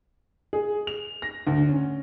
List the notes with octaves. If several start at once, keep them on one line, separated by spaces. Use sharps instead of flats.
G#4
F7
A#6
D2
C#4